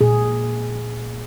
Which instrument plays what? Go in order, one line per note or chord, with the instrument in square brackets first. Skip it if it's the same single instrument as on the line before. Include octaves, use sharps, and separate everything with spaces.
[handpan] A#2 G#4